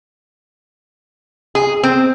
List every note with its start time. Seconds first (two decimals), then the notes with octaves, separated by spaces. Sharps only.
1.55 G#4
1.83 C4